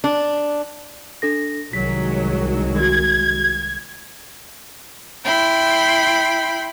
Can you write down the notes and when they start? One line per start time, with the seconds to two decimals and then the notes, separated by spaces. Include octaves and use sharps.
0.04 D4
1.22 D4 A4 A#6
1.73 C2 D#3 F#3 G#3 B6
2.80 F#4 G#6
5.24 E4 G5 B5 C6